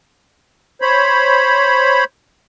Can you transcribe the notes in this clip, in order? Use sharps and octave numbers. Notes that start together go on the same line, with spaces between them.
C5 C#5 B5